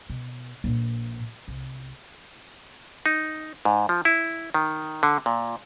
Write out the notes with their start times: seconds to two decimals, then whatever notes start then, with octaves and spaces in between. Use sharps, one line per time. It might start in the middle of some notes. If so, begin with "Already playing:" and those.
0.10 B2
0.64 A#1 A#2
1.48 C2
3.06 D#4
3.65 G#2
3.89 F3
4.05 E4
4.54 D#3
5.03 D3
5.26 A#2